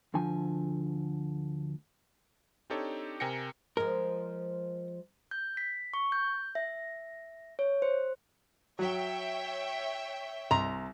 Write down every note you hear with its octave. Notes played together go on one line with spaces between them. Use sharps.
D2 D3 F3 G#5
C4 D4 D#4 G4 A4 C#5
C3 A#4 G5 G#5 A#6 C#7
F3 G#3 A#4
G6
B6
C#6
G6
E5
C#5
C5
F#3 C#5 E5 G5
C2 A#5 C6